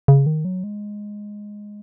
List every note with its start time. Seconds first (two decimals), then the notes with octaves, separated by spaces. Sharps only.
0.08 C#3
0.26 D#3
0.45 F#3
0.64 G#3